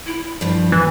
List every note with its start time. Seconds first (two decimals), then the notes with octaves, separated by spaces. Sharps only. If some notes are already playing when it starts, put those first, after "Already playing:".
0.07 E4
0.41 G2 F3
0.72 E3